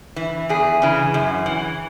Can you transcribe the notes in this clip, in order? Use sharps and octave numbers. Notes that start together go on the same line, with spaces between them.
E3
E2 G#4
C#3 E3
F#2
E3